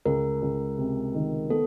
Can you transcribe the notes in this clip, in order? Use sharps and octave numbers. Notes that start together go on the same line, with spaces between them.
C#2 A#4
C#2
C3
D#3
B3 A4